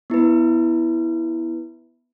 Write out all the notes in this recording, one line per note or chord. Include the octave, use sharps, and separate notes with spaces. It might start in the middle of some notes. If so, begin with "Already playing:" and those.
B3 E4 B4